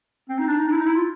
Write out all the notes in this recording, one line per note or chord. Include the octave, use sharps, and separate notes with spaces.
C4
D#4
D4
D#4
D4
E4
D#4
E4
F4